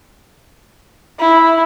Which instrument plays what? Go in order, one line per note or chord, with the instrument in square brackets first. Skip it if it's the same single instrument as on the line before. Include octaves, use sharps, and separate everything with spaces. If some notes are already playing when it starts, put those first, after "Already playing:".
[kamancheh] E4